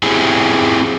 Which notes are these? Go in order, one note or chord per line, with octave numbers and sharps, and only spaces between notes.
C4 E4 G4 G#4